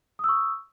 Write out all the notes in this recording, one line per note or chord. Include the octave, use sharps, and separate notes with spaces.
C#6 D#6 E6